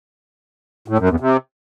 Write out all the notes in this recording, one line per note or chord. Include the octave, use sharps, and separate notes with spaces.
A2
F#2
E2
C3